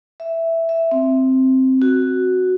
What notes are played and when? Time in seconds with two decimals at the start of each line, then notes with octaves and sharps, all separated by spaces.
0.20 E5
0.69 E5
0.91 C4
1.82 F#4